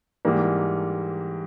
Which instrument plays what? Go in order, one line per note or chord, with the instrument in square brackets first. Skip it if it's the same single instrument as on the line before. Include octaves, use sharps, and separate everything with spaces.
[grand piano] G#2 E3 G3 A#3